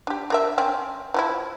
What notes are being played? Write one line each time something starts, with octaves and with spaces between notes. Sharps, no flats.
D4 G4
D4 A#4 E5
C4 C#4
E3 F3 E4